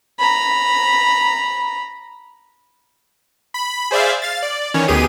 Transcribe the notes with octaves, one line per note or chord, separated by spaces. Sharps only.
A#5 B5
B5
G#4 C5 D5 E5 F5
F5 A6
D5
D#3 E3 C#4 C#5
D2 D#3 B3 G4 G#4 D#7